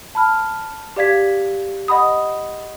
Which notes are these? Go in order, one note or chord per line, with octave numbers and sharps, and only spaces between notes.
A5 B5 F6
G4 D5 F5 G#6 B6
D#5 F#5 B5 D#6